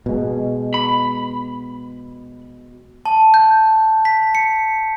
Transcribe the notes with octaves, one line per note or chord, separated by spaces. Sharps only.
B2 G#3
B5
A5
G6
B6
C#7